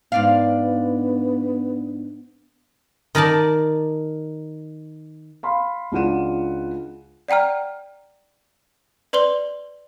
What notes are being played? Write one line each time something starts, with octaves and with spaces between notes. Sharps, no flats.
G#2 B3 D4 F5
D#3 A#4 D5 A5
F5 B5 C6
C#2 D4 F4 F#5 D#7 E7
D5 F#5 G5 A#5 F6
B4 D5 C6 F#7 G7